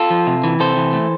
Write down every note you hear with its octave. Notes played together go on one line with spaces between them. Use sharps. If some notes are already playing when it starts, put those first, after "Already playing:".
Already playing: F4 A4
F3
C3
E3
C3 A4 C5
E3
A3